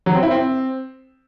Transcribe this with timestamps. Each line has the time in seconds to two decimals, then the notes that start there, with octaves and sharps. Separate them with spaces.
0.06 F#3
0.14 C4
0.23 E4
0.31 C4